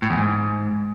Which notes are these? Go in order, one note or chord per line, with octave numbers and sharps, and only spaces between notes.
A2
E2
G#2